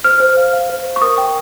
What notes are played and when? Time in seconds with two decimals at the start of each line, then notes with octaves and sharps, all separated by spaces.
0.04 C5 F6
0.20 C5
0.37 F5
0.53 F5
0.70 C5
0.86 C5
0.96 C#6
1.02 A#4 D#6
1.18 G5